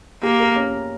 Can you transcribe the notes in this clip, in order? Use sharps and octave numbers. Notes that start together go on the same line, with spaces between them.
A#3 G4
A#4
C#4